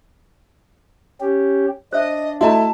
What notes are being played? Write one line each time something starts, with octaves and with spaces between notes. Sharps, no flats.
C#4 G4
D4 C5 D#5 E5
A3 E4 F#4 D#5 A5 A#5